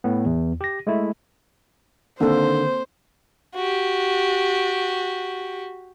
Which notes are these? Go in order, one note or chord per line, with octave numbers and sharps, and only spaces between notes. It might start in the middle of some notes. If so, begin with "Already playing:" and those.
A2 B3
E2
G4 A#6
G#3 A3 E4
D3 D#3 A#3 C4 A4 C5
F#4 G4